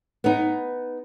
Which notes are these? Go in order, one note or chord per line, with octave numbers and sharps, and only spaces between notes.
B3 D#4